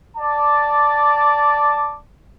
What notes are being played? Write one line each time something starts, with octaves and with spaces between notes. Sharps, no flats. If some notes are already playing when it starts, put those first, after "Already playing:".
D5 A5 D6